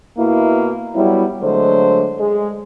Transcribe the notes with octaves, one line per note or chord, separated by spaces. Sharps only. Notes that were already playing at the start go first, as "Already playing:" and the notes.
B2 A#3 E4
F#3 G3 B3 E4
D3 F#3 G#3 A3 C5
G#3